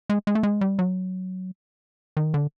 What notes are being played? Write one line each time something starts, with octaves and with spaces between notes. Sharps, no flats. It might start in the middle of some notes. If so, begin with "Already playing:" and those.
G#3
G#3
A3
G#3
G3
F#3
D#3
D3